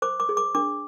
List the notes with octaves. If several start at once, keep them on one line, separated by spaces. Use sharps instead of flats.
C5 D6
D6
G#4
D6
D4 D6